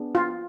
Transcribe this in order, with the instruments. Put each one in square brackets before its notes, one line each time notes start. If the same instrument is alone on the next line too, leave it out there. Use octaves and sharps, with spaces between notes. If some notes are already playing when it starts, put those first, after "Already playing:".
Already playing: [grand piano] B3 D4 G#4
[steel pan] F4